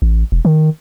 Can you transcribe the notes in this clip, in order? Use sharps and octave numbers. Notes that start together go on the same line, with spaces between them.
A1
E1
D#3